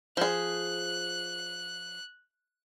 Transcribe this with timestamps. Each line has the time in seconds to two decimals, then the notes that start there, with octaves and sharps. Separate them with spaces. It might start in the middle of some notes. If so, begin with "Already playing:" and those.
0.17 F3 G#4 F#6